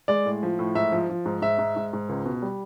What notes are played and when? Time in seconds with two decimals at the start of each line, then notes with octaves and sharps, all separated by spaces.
0.08 G#3 D5
0.26 A2
0.43 F3
0.59 A2
0.75 G#2 E5
0.92 F3
1.09 F3
1.25 G#2
1.42 G#2 E5
1.59 G#2
1.76 G#2
1.93 G#2
2.09 C#2
2.25 B2
2.42 G3